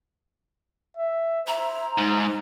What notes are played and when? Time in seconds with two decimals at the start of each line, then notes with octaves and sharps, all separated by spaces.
0.97 E5
1.47 C5 E5 A#5
1.98 G#2 D#4